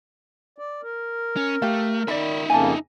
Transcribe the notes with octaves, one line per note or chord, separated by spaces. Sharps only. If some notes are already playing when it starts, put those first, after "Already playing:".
D5
A#4
C#4
A3 G4 F5
D#3 D#4 D5 E5 B5
F2 C#3 A#3 G#5 A5